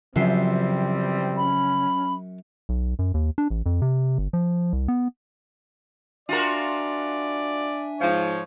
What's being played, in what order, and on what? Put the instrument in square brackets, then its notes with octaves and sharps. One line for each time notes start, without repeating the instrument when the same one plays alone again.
[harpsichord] F#2 E5 C6 [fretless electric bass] C#3 F3 [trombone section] E3 G3 C4
[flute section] C#4 B5
[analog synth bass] B1
F#2
D#2
D4
A1
F2
C3
G1
F3
C2
B3
[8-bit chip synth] D4 E5 G#5 [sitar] F4 F#4 A#4 [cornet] D5
[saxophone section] G#2 F3 [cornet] C#5